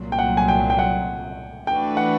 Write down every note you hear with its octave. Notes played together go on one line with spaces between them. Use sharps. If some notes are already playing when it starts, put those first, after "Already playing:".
Already playing: C2 A#2 F#3
G5
F#5
G#5
G5
G5
F#5
E3 A3 D4 F#4 B4 G5
F#5